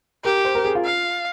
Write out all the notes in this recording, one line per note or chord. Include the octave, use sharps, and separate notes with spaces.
G4 A#4
C5
A#4
G#4
F4
F5